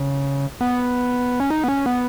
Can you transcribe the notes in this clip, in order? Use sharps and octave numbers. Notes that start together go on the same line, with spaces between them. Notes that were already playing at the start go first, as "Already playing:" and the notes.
Already playing: C#3
B3
C#4
D#4
B3
C#4
B3